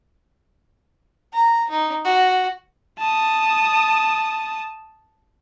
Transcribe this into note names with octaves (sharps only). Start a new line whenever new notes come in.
A#5
D#4
F#4
A5 D#6